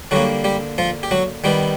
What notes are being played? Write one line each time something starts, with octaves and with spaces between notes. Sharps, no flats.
D3 F#3 G3 A#3 F#4
G3 G4
F3 F4
G4
F#3 F#4
D#3 G3 B3 G4